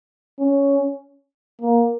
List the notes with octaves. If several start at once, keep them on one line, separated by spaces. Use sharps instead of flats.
C#4
A#3